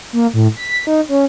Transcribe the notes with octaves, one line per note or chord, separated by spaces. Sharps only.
A#3
A2
B6
D#4
C#4